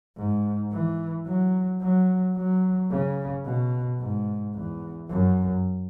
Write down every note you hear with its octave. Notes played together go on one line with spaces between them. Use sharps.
G#2
E3
F#3
F#3
F#3
C#3
B2
G#2
E2
F#2